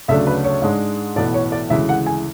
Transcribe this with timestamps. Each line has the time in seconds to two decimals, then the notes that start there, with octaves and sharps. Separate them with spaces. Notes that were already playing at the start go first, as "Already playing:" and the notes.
0.08 D2 C#3 F#3 A3 D4 E5
0.27 B4
0.44 C#5
0.62 G#2 G#3 D4
1.16 B1 A2 E3 B3 D5
1.34 C#5
1.52 D5
1.70 D2 C#3 E3 G#3 E5
1.89 F#5
2.06 G#5